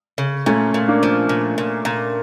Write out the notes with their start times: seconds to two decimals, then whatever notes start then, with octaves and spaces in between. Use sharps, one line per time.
0.18 C#3
0.46 A#2 A3 C#4
0.74 A#2
0.88 A#3 D4
1.03 F3
1.29 A#2
1.58 A#2
1.85 A#2